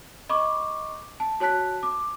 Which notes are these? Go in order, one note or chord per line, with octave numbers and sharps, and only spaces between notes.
D#5 B5 C#6 D6
A5
F#4 C#5 A5 F#6 B6
D6